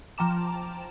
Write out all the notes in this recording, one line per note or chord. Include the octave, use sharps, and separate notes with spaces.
F3 G5 A5 A#5 D6 E7